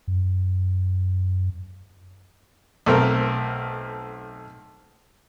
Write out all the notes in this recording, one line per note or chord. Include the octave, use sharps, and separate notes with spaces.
F#2
B1 A3 C4 A#4